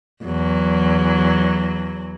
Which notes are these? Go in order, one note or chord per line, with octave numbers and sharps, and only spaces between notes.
E2 F#3